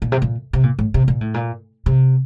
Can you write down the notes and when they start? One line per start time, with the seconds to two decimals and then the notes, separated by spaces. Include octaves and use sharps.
0.02 A#2
0.12 C3
0.22 A#2
0.53 C3
0.63 A#2
0.79 A2
0.94 C3
1.08 A#2
1.21 A2
1.34 A#2
1.86 C3